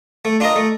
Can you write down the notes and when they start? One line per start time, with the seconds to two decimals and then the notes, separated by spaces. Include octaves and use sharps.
0.25 A3
0.40 D4 F4 A#4 D#5
0.56 A3